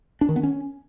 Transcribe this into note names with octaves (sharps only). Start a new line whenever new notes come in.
D4
D#3
B3
C#4